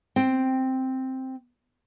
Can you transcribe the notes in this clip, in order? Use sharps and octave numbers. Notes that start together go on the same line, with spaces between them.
C4 G5